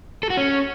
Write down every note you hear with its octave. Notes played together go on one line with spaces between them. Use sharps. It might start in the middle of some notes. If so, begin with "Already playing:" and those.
A4
F#4
C#4